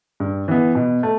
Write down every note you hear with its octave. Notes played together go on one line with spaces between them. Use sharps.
G2
E3 B3
B2
A3